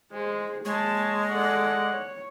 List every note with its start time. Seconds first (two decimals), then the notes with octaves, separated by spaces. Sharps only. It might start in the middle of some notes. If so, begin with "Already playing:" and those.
0.13 G#3 G#4 C5
0.65 G#3 A#3 C#5 A5
1.31 A4 D5 F#5
1.92 C#5